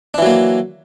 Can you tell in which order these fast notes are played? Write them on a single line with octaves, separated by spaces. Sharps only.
D4 E3 F#3 A#3